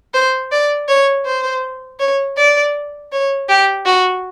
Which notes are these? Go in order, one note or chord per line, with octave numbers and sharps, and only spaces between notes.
C5
D5
C#5
C5
C#5
D5
C#5
G4
F#4